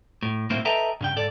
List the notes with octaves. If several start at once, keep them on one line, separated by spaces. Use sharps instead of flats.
A2
B1 A2 A#3 C4 E4 C5
A4 B4 D#5 E5 G5 A#5
G2 C#3 G5
G#2 A4 D5